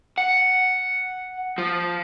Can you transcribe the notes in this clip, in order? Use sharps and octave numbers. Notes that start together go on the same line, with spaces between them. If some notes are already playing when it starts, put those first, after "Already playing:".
F#5
F3